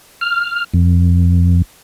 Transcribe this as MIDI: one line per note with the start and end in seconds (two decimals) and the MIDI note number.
0.21 0.64 89
0.74 1.62 41